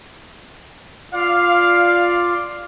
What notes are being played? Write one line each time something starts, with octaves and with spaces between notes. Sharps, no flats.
F4 D5 F5